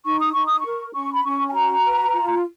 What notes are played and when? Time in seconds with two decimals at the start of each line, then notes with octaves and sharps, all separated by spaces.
0.05 D#4 C#6
0.19 D#6
0.33 D#4 C#6
0.46 D#6
0.60 A#4 C#6
0.94 C#4 C#6
1.12 B5
1.24 C#4 C#6
1.48 G#5
1.53 F#4 A#5
1.83 B4
2.12 F4